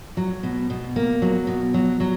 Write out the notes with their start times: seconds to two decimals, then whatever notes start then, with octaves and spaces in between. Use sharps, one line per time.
0.17 F#3
0.43 B2
0.70 B2
0.96 A#3
1.22 F#3
1.47 B2
1.74 F#3
2.00 F#3